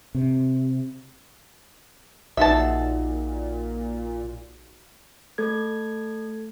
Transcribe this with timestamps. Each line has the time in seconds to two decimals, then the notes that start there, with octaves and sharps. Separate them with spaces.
0.15 C3
2.37 A#1 A#2 D#4 F#4 G#4 E5 A5
5.38 A3 A4 G#6